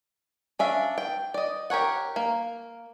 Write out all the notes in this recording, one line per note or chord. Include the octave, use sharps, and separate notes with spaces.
C#4 D4 E5 F5
G5
D5 D#5
G4 A#4 C#5 F#5
A#3